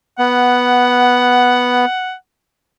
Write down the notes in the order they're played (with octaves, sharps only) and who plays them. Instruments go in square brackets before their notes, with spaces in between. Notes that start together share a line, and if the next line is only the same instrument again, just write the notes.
[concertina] B3 [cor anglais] F#5